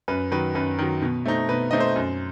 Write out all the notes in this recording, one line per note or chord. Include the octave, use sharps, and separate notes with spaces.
F#2 B4
D#3 F#3 B4
F#2 B4
D#3 F#3
B2
A3 C4 D#4
B2 B4
A3 C4 D#4 D#5
C5
F#2